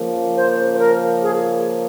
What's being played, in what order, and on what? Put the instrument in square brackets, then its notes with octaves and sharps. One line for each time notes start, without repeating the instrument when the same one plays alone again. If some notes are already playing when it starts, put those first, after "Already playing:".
Already playing: [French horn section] C#3 F3 A#3
[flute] C5
C5
A#4
G#4